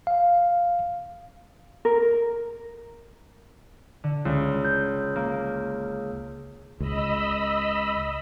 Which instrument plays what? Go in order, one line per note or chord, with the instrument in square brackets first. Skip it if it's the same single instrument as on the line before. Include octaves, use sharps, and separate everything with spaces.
[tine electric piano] F5
[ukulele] A#4
[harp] D3
C#2
G6
A#3
[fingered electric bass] C#2 [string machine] D#5 B5 E6